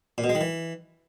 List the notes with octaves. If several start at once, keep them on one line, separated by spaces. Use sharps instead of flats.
A#2
B2
G#3
D#3
E3